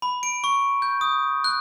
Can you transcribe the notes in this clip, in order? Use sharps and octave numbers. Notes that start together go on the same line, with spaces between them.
B5
D7
C#6
G6
D#6
F#6